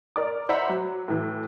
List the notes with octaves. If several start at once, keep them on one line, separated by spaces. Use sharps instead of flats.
A#4 D5 D6
C5 E5 F#5 A#5 B5
F#3
A2 E3